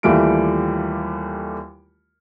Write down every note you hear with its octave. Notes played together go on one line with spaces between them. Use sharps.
D#2 E3 G3 A3 F4 D7